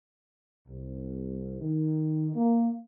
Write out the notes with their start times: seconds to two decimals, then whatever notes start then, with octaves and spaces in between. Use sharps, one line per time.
0.67 C2
1.60 D#3
2.35 A#3